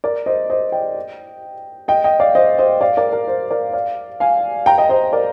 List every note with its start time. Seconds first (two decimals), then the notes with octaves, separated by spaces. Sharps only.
0.04 A#4 D5
0.26 C5 D#5
0.50 C5 D#5
0.72 D#5 G5
1.88 D#5 G5
2.04 D#5 G5
2.20 D5 F5
2.35 C5 D#5
2.59 C5 D#5
2.81 D5 F5
2.97 A#4 D5
3.12 A#4
3.27 C5
3.51 A#4 D5
3.73 D5 F5
4.20 F5 G#5
4.66 G5 A#5
4.78 D#5 G5
4.89 C5 D#5
5.13 A#4 D5